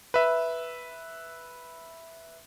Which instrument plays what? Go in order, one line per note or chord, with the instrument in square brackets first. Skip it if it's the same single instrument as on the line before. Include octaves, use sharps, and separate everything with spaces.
[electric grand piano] B4 E5